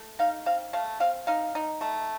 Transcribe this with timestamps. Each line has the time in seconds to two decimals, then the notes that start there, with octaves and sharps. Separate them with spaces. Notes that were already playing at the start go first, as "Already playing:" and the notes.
Already playing: A3
0.19 D#4 F5
0.46 C4 F5
0.73 A3 F5
1.00 C4 F5
1.27 D#4 F5
1.55 D#4
1.81 A3